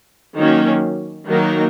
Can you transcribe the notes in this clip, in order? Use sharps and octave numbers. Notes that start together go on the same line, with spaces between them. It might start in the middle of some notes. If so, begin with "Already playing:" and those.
D#3 F#3 A#3 C#4
D#3 F#3 A#3 D#4 A#4